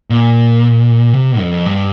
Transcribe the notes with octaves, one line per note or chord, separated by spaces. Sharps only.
A#2
C3
F2
G2